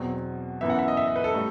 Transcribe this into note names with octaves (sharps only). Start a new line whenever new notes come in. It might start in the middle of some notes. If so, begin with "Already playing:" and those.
Already playing: E2 B2 F#3 C4
F#2 E3 B3 E5
F#5
E5
D#5
E5
D#5
B4
A4
A2 G3